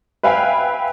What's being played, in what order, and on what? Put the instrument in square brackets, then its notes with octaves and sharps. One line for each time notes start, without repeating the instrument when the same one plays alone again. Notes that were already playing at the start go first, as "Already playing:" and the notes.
[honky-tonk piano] B4 E5 F5 G5 G#5 B5